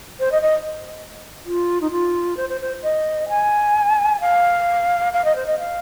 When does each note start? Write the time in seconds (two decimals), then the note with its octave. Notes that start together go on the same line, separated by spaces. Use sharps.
0.20 C5
0.32 D#5
0.42 D#5
1.46 F4
1.81 D#4
1.91 F4
2.37 C5
2.49 C5
2.61 C5
2.83 D#5
3.29 G#5
4.20 F5
5.13 F5
5.25 D#5
5.36 C5
5.47 D#5
5.59 F5